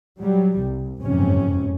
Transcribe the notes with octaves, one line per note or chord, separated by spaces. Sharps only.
F#3 G3
C2
F#1 F2 G#2 C3 C#4